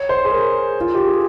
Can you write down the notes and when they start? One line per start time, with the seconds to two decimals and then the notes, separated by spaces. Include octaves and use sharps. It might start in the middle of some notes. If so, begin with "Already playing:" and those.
Already playing: C#5
0.09 C5
0.25 G#4
0.31 A#4
0.81 F4
0.95 G4
1.07 G#4